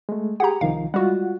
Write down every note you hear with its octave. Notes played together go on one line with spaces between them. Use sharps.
G#3 A3
G4 G#4 F#5 A#5
C2 D#3 F3 F5
G3 G#3 F4 F#4 F#5